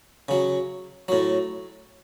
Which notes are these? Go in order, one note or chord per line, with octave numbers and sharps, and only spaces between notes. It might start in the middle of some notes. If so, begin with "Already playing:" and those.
C#3 F#3
A2 F#3